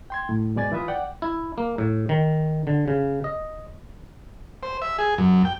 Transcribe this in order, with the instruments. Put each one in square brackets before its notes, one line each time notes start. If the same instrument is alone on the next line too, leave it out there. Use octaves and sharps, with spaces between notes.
[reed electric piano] G5 C6 G#6
A2
G#2 B2 G#3 D5 G#5 A6
E3 E4 F4 B4 E5 D#6
D5 F#5 G5
[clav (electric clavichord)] E4
A#3
A2
D#3
D3
C#3
D#5
[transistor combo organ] C5
E5
G#4
F#2
G5